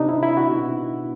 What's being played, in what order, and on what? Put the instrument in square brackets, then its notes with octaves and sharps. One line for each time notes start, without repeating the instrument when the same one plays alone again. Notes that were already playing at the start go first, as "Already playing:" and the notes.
Already playing: [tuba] C3 [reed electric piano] D4 D#4
[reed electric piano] E4
E4
F#4
[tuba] B2